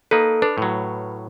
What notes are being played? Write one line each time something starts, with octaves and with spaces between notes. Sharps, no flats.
A#3 D#4 A4 B4
D4 B4
A2 F#3